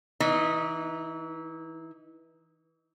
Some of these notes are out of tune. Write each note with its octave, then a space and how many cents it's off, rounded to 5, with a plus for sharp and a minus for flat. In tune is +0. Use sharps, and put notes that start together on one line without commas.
E3 -25 D#4 +5